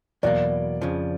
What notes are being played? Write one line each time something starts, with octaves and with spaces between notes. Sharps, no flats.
E2 B2 F#3 A#3 D5
F2 C#3 F3